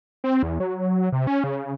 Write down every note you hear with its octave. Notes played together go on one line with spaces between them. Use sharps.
C4
E2
F#3
C3
C#4
C#3